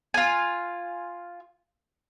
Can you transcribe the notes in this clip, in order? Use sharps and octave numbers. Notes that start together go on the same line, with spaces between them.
F4 G#5